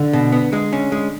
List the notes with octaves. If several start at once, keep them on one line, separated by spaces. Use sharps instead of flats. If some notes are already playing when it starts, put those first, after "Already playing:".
Already playing: D3
B2
B3
G#3
C#4
G#3